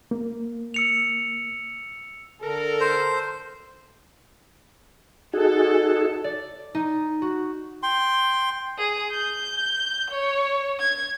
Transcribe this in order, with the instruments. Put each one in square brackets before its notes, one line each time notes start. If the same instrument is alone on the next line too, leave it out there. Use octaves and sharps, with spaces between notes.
[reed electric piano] A#3
[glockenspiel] E6 C#7 F7
[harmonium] D3 [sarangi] A4 [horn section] A#4
[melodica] C5
[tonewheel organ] D#4 F#4 G#4 [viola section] A4
[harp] D5
D#4
F#4
[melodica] G5 C6
[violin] G#4
G6
C#5
G#6